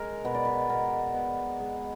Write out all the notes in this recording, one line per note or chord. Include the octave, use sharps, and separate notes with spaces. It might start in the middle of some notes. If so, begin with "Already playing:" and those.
Already playing: G#3 A#4
B2 B4
D5
B4
B2 A#4
B3
G#3